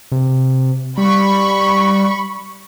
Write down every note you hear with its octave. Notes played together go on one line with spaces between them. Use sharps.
C3
G3 B5 C#6